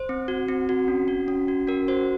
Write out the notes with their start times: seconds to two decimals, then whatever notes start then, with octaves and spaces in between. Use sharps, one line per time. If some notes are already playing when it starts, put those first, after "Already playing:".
Already playing: C5
0.09 C4
0.28 F#4
0.48 C4
0.69 F#4
0.88 C#4
1.08 F#4
1.28 C#4
1.48 F#4
1.67 C#4 A#4
1.88 F#4 C5